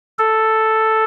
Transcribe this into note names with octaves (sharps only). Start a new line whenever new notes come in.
A4